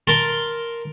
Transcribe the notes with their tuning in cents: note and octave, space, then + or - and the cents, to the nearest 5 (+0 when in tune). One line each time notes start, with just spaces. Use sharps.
A#4 +0 A5 +0 C6 +0